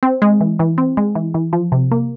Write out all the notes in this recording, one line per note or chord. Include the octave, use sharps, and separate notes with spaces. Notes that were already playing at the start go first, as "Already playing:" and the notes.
C4
G#3
E3
E3
C4
G#3
E3
E3
F3
C3
A#3